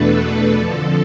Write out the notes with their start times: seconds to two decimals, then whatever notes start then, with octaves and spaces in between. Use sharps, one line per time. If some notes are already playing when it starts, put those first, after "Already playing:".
Already playing: E2 B2 A3 D4 A4 B4
0.55 F2 D3 F3